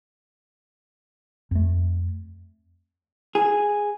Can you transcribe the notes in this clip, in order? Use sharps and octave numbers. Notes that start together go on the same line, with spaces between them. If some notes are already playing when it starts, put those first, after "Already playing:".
F2 A3
G#4